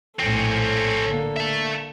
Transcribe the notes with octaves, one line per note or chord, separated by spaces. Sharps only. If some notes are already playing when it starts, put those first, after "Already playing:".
A#1 A2 C4 C#4 A4
D3 A#3
E5 A5